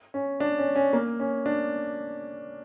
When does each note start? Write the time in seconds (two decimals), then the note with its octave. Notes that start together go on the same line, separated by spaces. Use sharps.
0.14 C#4
0.40 D4
0.58 C#4
0.76 C#4
0.93 A#3
1.20 C#4
1.46 D4